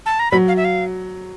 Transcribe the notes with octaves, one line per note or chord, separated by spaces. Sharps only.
A5
A#5
F#3 B5
F5
E5
F5